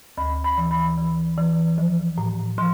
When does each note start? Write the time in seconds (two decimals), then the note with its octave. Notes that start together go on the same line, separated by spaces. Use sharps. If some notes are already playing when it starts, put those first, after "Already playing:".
0.17 D2 B5
0.44 B5
0.58 E3
0.71 B5
0.97 E3
1.37 E3
1.78 F3
2.18 A2
2.58 F3 C6